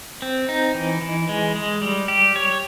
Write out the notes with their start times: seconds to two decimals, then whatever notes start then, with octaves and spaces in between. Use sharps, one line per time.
0.22 C4
0.49 D#4
0.74 E3
1.02 E3
1.29 G#3
1.56 G#3
1.82 G3
2.08 G4
2.36 C#5